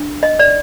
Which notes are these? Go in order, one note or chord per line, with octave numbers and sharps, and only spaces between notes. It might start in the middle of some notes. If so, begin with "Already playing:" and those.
Already playing: D4
D#5
D5